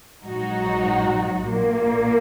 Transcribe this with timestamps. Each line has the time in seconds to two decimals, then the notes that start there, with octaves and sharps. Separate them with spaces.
0.23 A#1 G#2 F#3 D#4 F#4
1.43 A#1 A#2 A#3